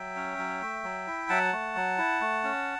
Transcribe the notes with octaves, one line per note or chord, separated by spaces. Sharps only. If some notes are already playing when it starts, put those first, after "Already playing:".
Already playing: F#3 E5 G5
C#4
F#3
A3
F#3
E4
F#3 F#5 A5
A3
F#3
E4
A3
C#4